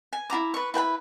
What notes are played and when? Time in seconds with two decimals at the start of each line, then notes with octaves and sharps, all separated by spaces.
0.13 G#5
0.30 E4 F4 A#5 D6
0.54 B4 C#6
0.74 E4 B4 G5 B5